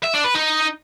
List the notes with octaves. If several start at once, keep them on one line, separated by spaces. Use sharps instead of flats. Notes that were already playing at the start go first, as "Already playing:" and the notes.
E5
D4
B4
D#4